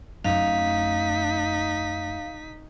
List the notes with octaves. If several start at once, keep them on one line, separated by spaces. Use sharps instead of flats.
F#2 A3 D#4 F5 B6